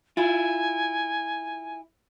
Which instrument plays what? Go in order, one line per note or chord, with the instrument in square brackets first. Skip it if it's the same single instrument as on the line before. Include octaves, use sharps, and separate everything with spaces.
[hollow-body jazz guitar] E4 F4 [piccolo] G#5